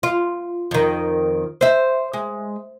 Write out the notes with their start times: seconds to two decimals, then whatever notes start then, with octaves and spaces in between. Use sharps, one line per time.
0.03 F4
0.71 F2 D#3
1.61 C5 E5
2.13 G#3